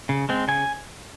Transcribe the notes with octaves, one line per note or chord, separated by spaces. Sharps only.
C#3
G#3 C4
C#3 G#5